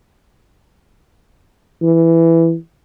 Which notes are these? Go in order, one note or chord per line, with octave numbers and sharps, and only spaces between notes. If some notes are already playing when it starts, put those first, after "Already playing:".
E3